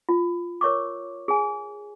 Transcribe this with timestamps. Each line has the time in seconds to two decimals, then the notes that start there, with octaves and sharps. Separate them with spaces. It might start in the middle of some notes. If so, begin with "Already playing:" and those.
0.09 F4
0.61 A#4 C#5 C#6 D6
1.28 G#4 G#5